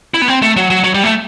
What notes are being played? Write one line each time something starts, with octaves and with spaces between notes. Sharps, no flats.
E4
B3
C4
A3
F#3
F#3
F#3
G3
A3